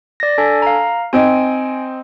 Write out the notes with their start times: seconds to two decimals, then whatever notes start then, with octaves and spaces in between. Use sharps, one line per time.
0.20 D5 A#6
0.38 D4 A4 G#5
0.62 F5 A#5
1.13 C4 D#4 G#5 D7